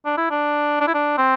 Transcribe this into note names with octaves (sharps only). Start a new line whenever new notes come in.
D4
E4
D4
D4
E4
D4
C4